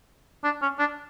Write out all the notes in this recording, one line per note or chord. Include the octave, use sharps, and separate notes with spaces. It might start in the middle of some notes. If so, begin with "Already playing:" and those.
D4
C#4
D4